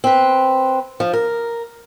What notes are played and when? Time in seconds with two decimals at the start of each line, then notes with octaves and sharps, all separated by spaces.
0.04 C4 B4
1.00 F3
1.13 A#4